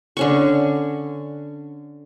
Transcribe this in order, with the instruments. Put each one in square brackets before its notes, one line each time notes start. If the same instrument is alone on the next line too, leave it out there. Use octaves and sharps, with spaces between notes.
[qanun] D3 C#4 C#6